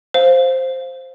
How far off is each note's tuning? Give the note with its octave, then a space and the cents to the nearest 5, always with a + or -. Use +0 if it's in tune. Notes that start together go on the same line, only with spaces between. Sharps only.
C5 +5 F5 +0